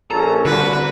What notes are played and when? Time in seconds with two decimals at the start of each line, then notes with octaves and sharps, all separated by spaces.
0.11 A#1 C#4 A4 A#5
0.45 C2 D3 F#4 B4